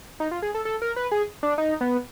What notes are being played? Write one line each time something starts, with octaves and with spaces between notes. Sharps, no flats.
D#4
F4
G#4
A4
A4
A#4
B4
G#4
D4
D#4
B3